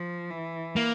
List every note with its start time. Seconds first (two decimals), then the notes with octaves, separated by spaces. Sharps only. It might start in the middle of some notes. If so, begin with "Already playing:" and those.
Already playing: F3
0.30 E3
0.76 A#3